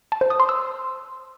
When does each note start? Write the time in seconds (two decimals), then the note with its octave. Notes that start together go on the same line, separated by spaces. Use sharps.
0.12 A5
0.21 C5
0.30 D#6
0.40 C6
0.49 E6